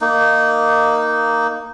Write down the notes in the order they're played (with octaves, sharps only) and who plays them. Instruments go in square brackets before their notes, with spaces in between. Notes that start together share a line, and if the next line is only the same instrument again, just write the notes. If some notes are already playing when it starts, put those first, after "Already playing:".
[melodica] A#3 D#4